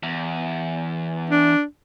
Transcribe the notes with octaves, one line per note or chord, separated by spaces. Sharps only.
E2
D4